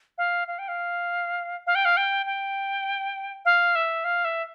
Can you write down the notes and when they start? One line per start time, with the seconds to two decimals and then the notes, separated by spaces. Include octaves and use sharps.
0.18 F5
0.48 F5
0.59 G5
0.68 F5
1.67 F5
1.75 G5
1.85 F5
1.97 G5
2.26 G5
3.45 F5
3.75 E5
4.04 F5
4.25 E5